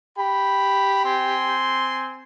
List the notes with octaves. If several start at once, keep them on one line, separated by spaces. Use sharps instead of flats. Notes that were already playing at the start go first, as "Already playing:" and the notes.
G4 B5
C4 G#5 C6